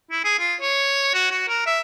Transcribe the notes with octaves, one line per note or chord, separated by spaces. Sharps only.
E4
G#4
F4
C#5
F#4
F#4
A#4
E5